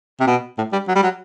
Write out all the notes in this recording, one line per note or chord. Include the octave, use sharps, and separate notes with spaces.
C3
B2
A2
G3
F#3
G3
F#3